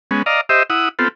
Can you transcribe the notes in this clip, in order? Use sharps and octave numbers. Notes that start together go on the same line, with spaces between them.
G#3 B3 C#4
D5 D#5 F5 A#5
G4 C5 D#5 E5
E4 F#5 D#6
B3 C4 F4 A4